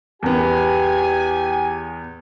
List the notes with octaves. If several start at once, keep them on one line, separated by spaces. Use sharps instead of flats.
E2 B3 G4 G#5